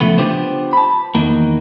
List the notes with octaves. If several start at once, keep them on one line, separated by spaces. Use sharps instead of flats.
C#3 F3 A3 B3
B3 D4 F4 G4 B4 C5
A5 B5
E2 D#3 A#3 F#4